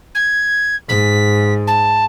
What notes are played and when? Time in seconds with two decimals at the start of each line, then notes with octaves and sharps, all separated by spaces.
0.15 G#6
0.89 G#2 B6
1.67 A5